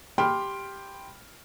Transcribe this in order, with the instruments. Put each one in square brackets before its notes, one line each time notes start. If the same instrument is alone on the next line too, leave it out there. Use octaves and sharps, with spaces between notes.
[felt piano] G4 G5 B5 C6 F6